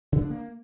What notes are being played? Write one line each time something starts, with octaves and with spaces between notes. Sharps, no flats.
C#3
D4
A#3